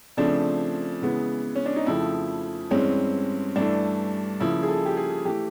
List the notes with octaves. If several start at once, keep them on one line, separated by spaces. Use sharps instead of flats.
C#3 F3 A3 C4 D4
C#3 E3 G#3 B3
C#4
D4
D#4
F2 C#3 F3 A3 E4
G2 E3 G#3 C4 C#4
G2 E3 A3 D4
C#3 F3 A#3 E4
G#4
A4
G4
G#4
E3 A3 G4